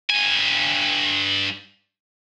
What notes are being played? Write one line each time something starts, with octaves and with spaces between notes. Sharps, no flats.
G2 G#5